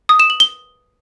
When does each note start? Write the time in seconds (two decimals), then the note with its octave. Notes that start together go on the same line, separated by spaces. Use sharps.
0.09 D#6
0.20 E7
0.30 F#7
0.40 G7